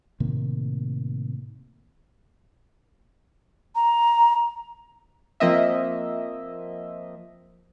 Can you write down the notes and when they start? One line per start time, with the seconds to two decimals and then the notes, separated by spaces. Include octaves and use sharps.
0.20 A2 C3 D#3 A#3
3.75 A#5
5.40 F3 A#3 C4 D#5 E5